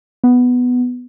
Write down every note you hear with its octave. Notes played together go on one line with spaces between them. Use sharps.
B3